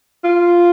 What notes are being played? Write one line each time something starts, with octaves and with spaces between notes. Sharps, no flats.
F4